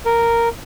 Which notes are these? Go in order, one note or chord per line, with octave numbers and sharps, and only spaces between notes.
A#4